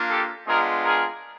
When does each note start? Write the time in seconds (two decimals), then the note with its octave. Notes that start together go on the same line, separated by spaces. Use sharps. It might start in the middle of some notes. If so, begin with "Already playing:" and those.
Already playing: A#3 D4 F4
0.09 G4 A4
0.47 G#3 B3 D4 F4 G#4 A#4
0.84 G#4 A#4